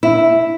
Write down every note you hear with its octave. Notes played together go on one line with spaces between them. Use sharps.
E4